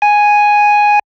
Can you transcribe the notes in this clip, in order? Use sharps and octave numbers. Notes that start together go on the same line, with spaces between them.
G#5